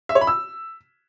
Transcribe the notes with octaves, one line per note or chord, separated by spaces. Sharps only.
E5
C#5
B5
E6